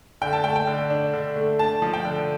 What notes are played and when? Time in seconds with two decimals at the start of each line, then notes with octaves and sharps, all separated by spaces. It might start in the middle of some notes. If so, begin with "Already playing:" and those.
0.21 D3 G5
0.33 A5
0.44 A3 G5
0.56 G5
0.67 D3
0.90 D4
1.13 D3
1.36 A3
1.59 D4 A5
1.82 F3
1.94 G5
2.05 D3